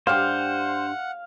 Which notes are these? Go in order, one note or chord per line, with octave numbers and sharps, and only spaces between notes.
G2 D4 G4 C5 F5 F#5